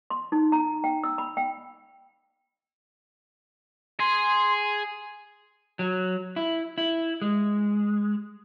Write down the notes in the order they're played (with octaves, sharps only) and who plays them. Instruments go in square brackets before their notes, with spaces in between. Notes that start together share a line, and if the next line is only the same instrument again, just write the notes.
[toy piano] C6
D#4
A#5
G5
E6
B5
G5
[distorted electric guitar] G#4 [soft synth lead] C6
[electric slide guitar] F#3
E4
E4
G#3